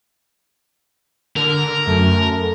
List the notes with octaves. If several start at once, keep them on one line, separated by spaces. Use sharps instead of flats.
D3 A#4
F#2 A3